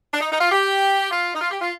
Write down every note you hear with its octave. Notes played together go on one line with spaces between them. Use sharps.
D4
D#4
D#4
F4
G4
F4
D#4
F4
G4
F4